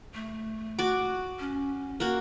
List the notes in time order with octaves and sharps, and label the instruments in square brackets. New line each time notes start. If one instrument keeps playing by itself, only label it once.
[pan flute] A3
[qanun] F#4 D6
[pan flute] C#4
[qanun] A#3 F#4